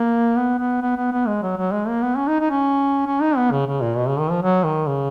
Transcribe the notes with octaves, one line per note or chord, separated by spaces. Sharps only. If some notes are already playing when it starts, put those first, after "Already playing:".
Already playing: A#3
B3
B3
B3
B3
B3
G#3
F#3
F#3
G#3
A#3
B3
C#4
D#4
D#4
C#4
C#4
D#4
B3
C#3
C#3
A#2
B2
C#3
D#3
F3
F#3
D#3
C#3